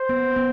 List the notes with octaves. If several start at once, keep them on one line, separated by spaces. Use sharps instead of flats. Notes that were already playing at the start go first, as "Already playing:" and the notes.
Already playing: C5
B3
B3